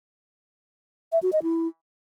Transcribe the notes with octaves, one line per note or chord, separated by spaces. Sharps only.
E5
F#4
D#5
E4